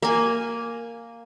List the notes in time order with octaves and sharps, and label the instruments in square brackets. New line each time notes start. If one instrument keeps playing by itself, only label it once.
[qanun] A#3 G#5